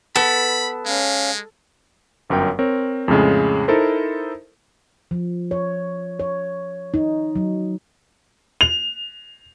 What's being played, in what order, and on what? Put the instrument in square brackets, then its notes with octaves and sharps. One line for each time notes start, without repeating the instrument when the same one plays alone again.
[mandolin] B3 [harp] A4 [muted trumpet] B5
[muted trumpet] G#3 [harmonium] C#4 F5
[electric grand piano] G1 F#2 A#4 G5
C4 A#4 C#5
F2 A2 C#3 G#3
D#4 E4 A4 A#4 C5
[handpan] F3
C#5
C#5
D#4
F#3
[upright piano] F7